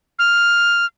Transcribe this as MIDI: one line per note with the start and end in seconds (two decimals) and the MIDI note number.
0.19 0.86 89